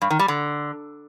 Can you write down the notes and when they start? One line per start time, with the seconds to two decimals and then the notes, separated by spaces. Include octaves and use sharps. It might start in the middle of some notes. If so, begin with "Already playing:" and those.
0.02 G2
0.10 D#3
0.19 G3
0.28 D3